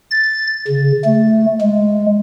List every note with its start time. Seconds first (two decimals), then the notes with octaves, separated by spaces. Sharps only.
0.11 A6
0.68 C#3
1.04 A3
1.61 G#3